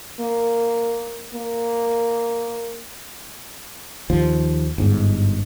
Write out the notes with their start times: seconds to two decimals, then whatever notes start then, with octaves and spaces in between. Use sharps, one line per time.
0.20 A#3
1.34 A#3
4.10 D#2 F3
4.78 G1 G#2